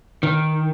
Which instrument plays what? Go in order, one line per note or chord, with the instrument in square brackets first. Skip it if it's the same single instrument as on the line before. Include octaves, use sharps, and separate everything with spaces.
[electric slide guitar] D#3